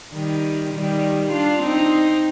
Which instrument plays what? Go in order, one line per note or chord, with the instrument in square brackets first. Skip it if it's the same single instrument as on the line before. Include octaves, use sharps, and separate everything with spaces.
[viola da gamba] D#3 G3
D#3 G3
D4 F4
C4 D#4